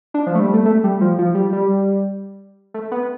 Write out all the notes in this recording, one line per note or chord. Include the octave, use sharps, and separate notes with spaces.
D4
F3
A3
G3
A3
A3
G3
F3
F3
G3
G3
A3
B3